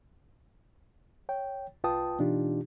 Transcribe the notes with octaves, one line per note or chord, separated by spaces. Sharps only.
C#5 G5
C2 F4 B4 G5 A5 D#6
B2 E3 D4 D#4 F4 G4